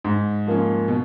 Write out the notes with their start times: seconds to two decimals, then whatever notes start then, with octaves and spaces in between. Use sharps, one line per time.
0.04 G#2
0.47 F3 A#3 C#4
0.88 B2